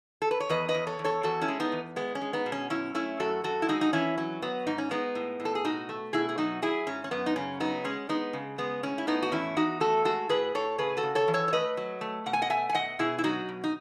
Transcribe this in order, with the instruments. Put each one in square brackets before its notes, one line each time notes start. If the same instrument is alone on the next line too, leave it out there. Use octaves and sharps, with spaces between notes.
[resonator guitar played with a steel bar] A4
B4
C#5
E2 B4 D#5
B4 D#5
E2
A4 C#5
E2
A4 C#5
E2 F#4 A4
C#4 E4
G#3
B3 D#4
E2
G#3 B3
C#4
G#3
B3 D#4
B2
C#4
F#2 C#4 E4
A3 C#4 E4
F#2 F#4 A4
F#2 F#4 A4
E4
G#3 D#4 F#4
D#4
E3 C#4 E4
F#3 C#4
F#3 B3
G#2 D#4
C#4
G#3 B3 D#4
A2
A2
A4
G#4
B2 D#4 F#4
A3
B2 E4 G#4
G#4
F#3 D#4 F#4
F#3 E4 G#4
G#2 C#4
C#4
F#2 B3
D#4
C#3 C#4
F#3 B3 D#4
G#3 C#4
G#3 B3 D#4
C#3
G#3 B3
A2 C#4
E4
A2 B3 D#4
F#4
E2 C#4 E4
E2 D#4 F#4
A3 F#4 A4
G#3 F#4 A4
A2 G#4 B4
A2 A4 C#5
C#3 G#4 B4
F#4 A4
C#3
A4 C#5
E3
A4 C#5
C#5
A3 B4 D#5
F#3
A3
B2 F#5
G#5
D#5 F#5
A3 E5 G#5
G#5
B2 D#5 F#5
B2 E4 G#4
E4
F#3 D#4 F#4
B2
D#4